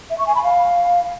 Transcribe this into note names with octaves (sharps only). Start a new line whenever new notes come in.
E5
C#6
G#5
B5
F5